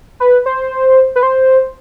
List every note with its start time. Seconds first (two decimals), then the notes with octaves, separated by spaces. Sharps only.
0.20 B4
0.46 C5
1.16 B4
1.23 C5